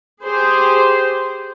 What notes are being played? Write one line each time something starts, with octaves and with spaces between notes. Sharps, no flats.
G4 G#4 C5